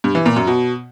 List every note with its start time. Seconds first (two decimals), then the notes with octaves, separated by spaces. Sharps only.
0.04 G2
0.15 E3
0.26 A#2
0.36 F#2
0.47 B2